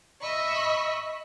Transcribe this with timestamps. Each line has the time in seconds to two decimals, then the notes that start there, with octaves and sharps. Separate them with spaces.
0.23 D#5 E5 B5 C#6